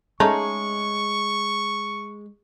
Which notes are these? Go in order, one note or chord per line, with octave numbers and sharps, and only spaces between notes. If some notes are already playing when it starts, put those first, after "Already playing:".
G#3 A3 C#4 D#4 C#6